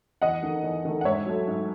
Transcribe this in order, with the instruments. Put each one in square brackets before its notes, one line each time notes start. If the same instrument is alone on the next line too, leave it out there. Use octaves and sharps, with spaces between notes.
[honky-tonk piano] E2 D#5 F#5
D#3 A3
E2
D#3 A3
F#5
G#2 C#5 E5
F#3 A3
G#2